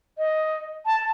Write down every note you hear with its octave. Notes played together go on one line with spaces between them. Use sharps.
D#5
A5